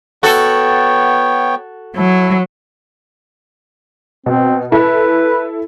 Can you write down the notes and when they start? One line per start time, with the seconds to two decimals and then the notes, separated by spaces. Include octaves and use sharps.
0.23 B3 F#4 A4 C#5 G5
1.97 F#3 E4 A4
4.26 B2 C4
4.72 E4 A4 B4